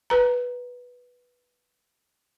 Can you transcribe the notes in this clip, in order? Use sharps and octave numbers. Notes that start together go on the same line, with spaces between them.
B4 A#5